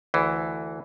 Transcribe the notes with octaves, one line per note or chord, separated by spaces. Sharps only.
D2 E3